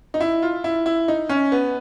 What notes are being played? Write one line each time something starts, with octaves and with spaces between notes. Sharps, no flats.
D#4
E4
F4
E4
E4
D#4
C#4
B3